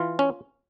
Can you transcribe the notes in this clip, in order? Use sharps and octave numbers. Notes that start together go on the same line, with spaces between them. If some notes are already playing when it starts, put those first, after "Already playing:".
Already playing: E3 F4
C#4